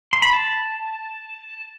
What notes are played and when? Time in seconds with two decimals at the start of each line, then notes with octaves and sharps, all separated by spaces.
0.13 C6
0.22 B5
0.33 A5